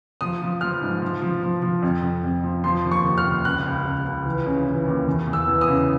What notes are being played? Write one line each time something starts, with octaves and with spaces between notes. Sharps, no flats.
F3 D#6
F3
F3 F6
G#2
F3
F3
F3
F3
F2
F2
F2
F3
F3 C6
D#2
C#6
D#2
F6
D#2
C#2 F#6
C#2
C#2
C#2
E3
C#3
E3
D#2
E2
E2
E6
E3
D#6
C#3